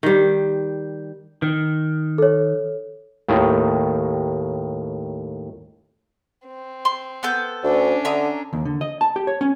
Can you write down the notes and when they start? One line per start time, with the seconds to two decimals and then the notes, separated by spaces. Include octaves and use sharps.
0.03 D#3 G3
1.42 D#3
2.18 A4 C#5
3.29 D#2 A2 D#3
6.47 C4
6.85 C6
7.23 B3 A4 G6
7.64 D2 C#4 D4
8.05 D3 E5 A#5 D#6
8.53 D#2
8.65 D3
8.81 D#5
9.01 A5
9.16 G4
9.27 C#5
9.41 C#4